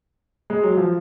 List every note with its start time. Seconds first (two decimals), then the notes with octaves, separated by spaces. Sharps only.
0.50 G#3
0.63 F#3
0.77 F3